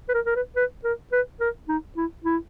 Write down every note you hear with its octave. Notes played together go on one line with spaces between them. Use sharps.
B4
A#4
A#4
B4
B4
A#4
B4
A#4
D#4
E4
E4